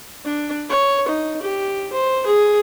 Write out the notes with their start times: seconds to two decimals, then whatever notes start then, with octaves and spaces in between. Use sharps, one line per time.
0.25 D4
0.69 C#5
1.08 D#4
1.42 G4
1.93 C5
2.26 G#4